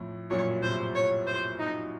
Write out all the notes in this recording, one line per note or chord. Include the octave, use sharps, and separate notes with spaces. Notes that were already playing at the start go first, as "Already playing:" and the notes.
Already playing: F2 A2
F#2 A#2 C#5
A2 C3 C5
C#5
C5
D#4